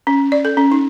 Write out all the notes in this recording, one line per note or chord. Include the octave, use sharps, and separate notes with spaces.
C#4
D5
A4
C#4
D#4